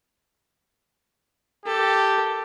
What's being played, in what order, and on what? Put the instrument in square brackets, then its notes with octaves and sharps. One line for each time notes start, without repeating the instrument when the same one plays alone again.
[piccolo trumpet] G4 [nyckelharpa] A4